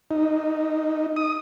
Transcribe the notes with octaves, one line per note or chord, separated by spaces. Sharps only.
D#4
D#6